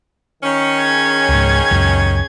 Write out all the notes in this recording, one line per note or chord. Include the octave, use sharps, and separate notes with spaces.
D#3 C#4
G#4 G#6
C#2 G#2
C#2 F#2